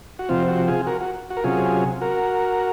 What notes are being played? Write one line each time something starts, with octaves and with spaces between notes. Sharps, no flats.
F#4
C3 F3 C4 F4
F#4
F4 G#4
F#4 A#4
F#4
F#4
A#4
C3 F#3 C#4 F4 G#4
F#4 A#4